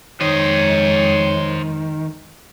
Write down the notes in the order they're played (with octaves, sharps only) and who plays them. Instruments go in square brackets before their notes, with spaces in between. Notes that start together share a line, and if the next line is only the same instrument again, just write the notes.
[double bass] F2 G#3 [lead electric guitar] D#3 [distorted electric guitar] C5 D#5 [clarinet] C#5